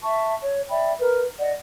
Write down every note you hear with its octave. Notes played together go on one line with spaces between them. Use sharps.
E5 A5 C#6
C#5
D5 E5 G5 B5
A#4 B4
D5 D#5 F#5